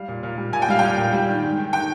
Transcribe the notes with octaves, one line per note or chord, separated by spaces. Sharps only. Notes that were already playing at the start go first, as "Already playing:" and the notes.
Already playing: G3 F5
A#2
A#2
G3
A#2 G#5
G5
G3 F5
A#2 G5
A#2
G3
D#3
G#2
D#3
D#3 G5